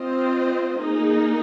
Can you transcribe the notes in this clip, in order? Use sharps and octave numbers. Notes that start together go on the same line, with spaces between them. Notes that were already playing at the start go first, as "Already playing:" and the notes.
Already playing: C4 F4 C5 D#5
A#3 D#4 G#4